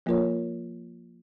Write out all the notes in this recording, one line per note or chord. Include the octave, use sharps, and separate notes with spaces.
F3 A#3 F4 A#4 C#5